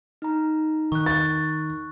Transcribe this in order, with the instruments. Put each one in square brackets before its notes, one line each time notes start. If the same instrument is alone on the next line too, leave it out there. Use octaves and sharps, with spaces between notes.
[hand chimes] D#4 A#5
[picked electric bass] D#3 [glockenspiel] C#6 F#6
[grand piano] A6